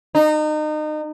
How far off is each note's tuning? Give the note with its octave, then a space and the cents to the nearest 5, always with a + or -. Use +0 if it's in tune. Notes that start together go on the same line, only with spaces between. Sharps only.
D#4 -30